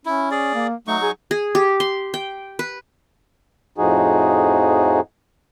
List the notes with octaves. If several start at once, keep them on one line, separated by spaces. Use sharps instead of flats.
C#4 E4
G#4 D5
A#3
F#3 A3 D#4 C#6
G#4
G#4
G4
C6
G5
B4
F2 A2 F3 D#4 F#4 G#4